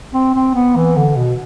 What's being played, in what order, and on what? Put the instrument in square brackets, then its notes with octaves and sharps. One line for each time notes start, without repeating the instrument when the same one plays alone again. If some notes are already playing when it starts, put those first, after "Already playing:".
[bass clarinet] C4
C4
B3
E3
D3
B2